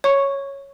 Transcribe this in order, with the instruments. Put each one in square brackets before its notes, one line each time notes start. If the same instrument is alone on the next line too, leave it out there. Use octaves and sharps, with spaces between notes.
[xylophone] C#5 C#6